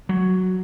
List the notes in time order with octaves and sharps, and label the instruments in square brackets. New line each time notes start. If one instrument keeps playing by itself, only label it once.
[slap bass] F#3